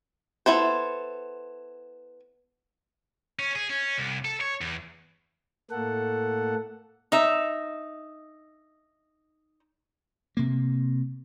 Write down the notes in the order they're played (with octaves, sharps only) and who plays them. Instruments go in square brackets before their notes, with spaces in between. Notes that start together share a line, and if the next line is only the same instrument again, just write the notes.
[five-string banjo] B3 E4 A4 C5
[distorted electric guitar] C#4
G#4
C#4
C2
A4
C#5
E2
[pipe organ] A2 A3 A#3 A4 F#5
[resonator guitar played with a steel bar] D#4 E5
[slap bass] C3 A#3